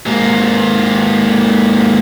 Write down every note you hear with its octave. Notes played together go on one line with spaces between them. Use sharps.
G#2 A#3